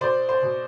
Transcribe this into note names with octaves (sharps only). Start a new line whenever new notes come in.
B2 C5 D5
C5
B2